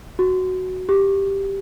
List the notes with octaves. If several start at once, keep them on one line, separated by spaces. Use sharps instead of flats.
F#4
G4